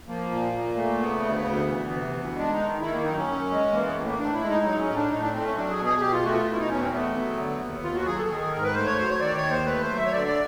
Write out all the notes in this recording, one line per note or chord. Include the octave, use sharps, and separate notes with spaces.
F3 A#3
A#2
A#2
A3
C#3 B3
D2
D2
E3
C3
D2
G#3 D4
D#4
D#3
D#3 E4
A#3
F#2 D#4
C#4
F#2
G#3
E3 A#3
B3
A2 A#3
A#3
A2 D4
E4
G#3
D#4
F#3 D#4
C#4
A2
D4
A2 D#4
D4
A3 C4
C#4
F#3 D4
G#4
B2
G#4
B2 G4
F4
A3 F#4
F4
B2
E4
D#4
E2 C#4
C4
A3 B3
F#3
D3
D#2
D#2 F4
F#4
F#3 G#4
A4
D#3 G#4
G#4
G#2 A#4
B4
A3 C5
C#5
F#3 C5
C#5
D#3 D5
C#5
D#2
C5
A3 B4
C5
F#3
E5
C#5
D3 D5
D5